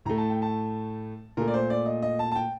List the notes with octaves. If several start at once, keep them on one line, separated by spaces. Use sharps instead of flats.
A2 A3 A#5
A5
G5
A5
A#2 A3 A#4
D5
C5
D5
D#5
D#5
A5
A5
G5